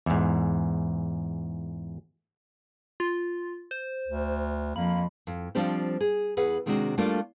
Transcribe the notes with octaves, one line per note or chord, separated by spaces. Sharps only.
E2 G#2
F4
C5
D2
F2 A#3 B5
F2
F3 G3 C4 D4 G4 C5
G#4
E2 G#4 B4 F#5
C3 D#3 G#3 C4 D4 F#4
G3 A3 A#3 D4 F4 G4